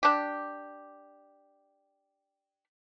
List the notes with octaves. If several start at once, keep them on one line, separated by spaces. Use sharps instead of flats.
D4 G4